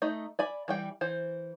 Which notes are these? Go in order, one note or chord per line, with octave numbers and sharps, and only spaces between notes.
A3 D#4 D#5
D5 G#5 B5
E3 G3 G5
E3 C5